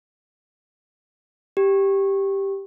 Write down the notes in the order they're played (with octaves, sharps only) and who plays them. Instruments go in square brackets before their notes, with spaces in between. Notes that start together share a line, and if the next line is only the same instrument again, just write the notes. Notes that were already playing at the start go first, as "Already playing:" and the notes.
[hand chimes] G4